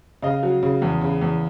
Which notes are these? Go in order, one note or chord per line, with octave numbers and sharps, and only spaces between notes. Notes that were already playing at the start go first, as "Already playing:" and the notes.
C#3 D#5 F5
F#3
C#3
E2
C#3
E2